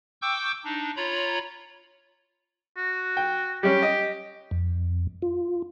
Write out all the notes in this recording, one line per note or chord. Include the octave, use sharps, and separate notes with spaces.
G5 C#6 D6 E6 G6
D4 D#4
F4 C#5 A#5 B5
F#4
G5
G3 C#4 G4
D#5
F2
F4